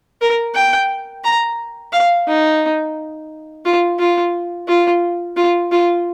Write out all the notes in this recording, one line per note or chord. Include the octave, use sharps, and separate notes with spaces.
A#4
G5
A#5
F5
D#4
F4
F4
F4
F4
F4